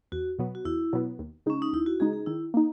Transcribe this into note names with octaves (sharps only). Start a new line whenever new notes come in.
E2 F#4
B2 F#3 B3
F#4
E2 E4
B2 F#3 B3
D#2
C#3 G#3 C#4 D#4
D#4
D#2 E4
F#4
C#3 G#3 D#4 G#4
G#4
D#3 E4
A#3 D#4